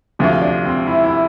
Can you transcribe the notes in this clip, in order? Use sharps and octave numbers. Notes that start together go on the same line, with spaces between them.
D2 C3 F3
D4
C4
E4
E4